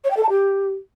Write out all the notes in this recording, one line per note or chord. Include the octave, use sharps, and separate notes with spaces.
C#5
G5
A4
A5
G4